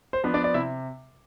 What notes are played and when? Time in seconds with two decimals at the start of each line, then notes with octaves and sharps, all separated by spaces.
0.13 C5
0.24 F3 B3 D4
0.34 D4 D5
0.44 D5
0.54 C3 E4 E5